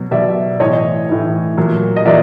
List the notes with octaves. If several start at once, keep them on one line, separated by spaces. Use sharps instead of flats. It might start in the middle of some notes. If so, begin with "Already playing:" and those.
Already playing: B2 F#3
B2 F#3 D5 E5
A2 E3 C#5 D#5
A2 E3
A#2 F#3
D#5
A#2 F#3 D5 E5